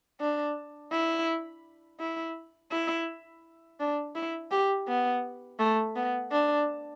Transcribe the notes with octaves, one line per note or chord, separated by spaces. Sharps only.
D4
E4
E4
E4
D4
E4
G4
B3
A3
B3
D4